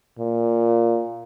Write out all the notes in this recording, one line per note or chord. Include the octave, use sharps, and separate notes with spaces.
A#2